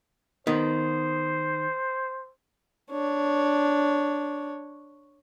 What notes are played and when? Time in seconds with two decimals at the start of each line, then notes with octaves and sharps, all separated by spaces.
0.47 D#3 B3 C5
2.91 D4 C#5